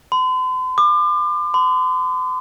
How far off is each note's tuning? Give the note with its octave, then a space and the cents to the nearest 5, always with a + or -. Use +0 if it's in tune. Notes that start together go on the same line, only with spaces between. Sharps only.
C6 -45
D6 +35
C6 -45